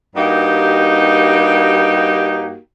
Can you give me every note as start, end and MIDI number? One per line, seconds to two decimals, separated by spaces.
0.15 2.57 43
0.15 2.57 58
0.15 2.57 63
0.15 2.57 66
0.15 2.57 67